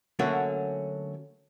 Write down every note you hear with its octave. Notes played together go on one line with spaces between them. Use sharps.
D3 F#3 A3 A#3 C#4 F#4